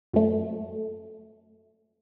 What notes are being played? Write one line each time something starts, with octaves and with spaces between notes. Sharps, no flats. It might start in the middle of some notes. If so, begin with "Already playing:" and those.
F#2 A3